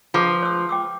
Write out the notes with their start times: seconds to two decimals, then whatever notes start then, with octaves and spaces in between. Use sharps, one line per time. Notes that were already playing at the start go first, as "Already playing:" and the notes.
0.14 F3 F4 G#4 B4
0.43 C5 E6
0.69 G5 D6 E6